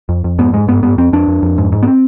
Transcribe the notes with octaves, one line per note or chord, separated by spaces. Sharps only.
F2
F2
G#2 B3
G#2 G#3
G2 B3
G2 B3
F2 C4
F2 D4
F2
F2
G#2
G#2
B3
C4